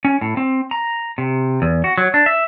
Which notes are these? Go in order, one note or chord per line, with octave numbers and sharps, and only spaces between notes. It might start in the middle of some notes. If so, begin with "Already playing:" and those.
C#4
A2
C4
A#5
C3
E2
F#4
F#3
D4
E5